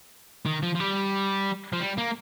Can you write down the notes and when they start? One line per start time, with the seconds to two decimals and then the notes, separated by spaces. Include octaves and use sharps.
0.46 D#3
0.63 F3
0.75 F3
0.80 G3
1.73 F3
1.80 G3
1.98 A#3